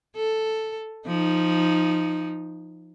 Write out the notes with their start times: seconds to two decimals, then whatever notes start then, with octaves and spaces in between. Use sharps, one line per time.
0.16 A4
1.07 F3 D#4